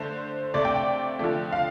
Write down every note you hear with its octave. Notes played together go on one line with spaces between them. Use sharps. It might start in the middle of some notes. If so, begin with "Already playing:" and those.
Already playing: D3 A3 C5
C3 A3 D5
G5
G5
D3 F3 A3
F5